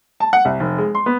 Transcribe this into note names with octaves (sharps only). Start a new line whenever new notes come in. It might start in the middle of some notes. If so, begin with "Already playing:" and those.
A5
F#5
C2
F1
G#3
C6
B3